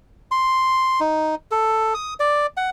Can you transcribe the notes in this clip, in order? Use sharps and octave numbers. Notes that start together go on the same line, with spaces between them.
C6
D#4
A4
D#6
D5
F#5